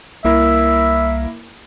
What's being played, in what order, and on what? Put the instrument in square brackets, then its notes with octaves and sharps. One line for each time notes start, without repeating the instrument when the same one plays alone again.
[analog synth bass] C2 [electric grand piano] A#3 E4 A#4 [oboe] E5